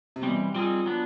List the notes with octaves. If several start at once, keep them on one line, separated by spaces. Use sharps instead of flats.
C3
B2 E3 G3 C4
F3 G3 C4 D#4 G#4
F#3 B3 D4